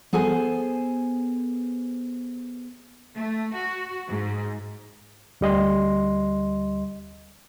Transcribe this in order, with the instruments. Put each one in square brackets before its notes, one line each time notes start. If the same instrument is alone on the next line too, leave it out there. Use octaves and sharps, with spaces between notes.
[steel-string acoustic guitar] B3 G#4 A4 C5 G#5
[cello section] A3
F#4
G#2
[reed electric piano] D2 G3 D#5 C6